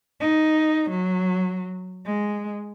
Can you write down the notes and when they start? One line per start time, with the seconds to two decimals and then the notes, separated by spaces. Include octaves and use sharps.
0.20 D#4
0.90 F#3
2.06 G#3